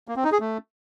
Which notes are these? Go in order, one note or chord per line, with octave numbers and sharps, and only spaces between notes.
A#3
C4
D#4
G#4
A3